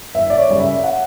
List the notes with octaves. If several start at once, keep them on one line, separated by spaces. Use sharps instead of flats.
F#1 E5
D5
C#5
F#2 C#3 G3
E5
F#5